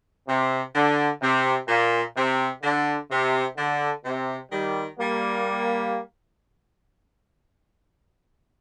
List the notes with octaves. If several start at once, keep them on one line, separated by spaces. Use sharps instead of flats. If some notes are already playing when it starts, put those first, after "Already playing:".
C3
D3
C3
A#2
C3
D3
C3
D3
C3
D#3 G3
G3 A#3